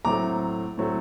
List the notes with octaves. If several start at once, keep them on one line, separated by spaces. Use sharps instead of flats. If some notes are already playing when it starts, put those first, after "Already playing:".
A2 F#3 A3 C4 A#5 D6
A2 F#3 A3 C4